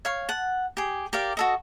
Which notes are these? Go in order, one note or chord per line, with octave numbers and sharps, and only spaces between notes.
C#5 F5 C#6
F#5 A5
G4 G#4
G4 A#4 D5 F5
F#4 A4 D#5